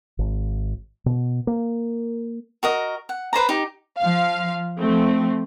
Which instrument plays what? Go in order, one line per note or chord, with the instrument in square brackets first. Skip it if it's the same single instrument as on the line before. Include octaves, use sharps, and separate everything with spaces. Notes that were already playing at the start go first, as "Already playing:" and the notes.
[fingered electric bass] G#1
B2
A#3
[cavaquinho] F#4 A#4 D#5
F#5
B4 C5 D5 A#5
D#4 G4
[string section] F3 F5
F3 A3 C4